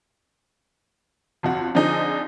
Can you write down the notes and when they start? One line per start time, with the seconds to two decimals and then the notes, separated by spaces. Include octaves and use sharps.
1.43 G1 F2 F#4
1.75 D3 F3 C4 D4 D#4 G#4